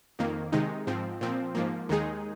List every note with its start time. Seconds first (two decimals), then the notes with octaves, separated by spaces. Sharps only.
0.19 F2 D#3 A#3
0.52 C3 D#3 G#3 D#4
0.87 G#2 F3 C4
1.21 A#2 F3 C4
1.55 G#2 F3 A#3
1.89 D#2 D#3 G#3 D#4 G#4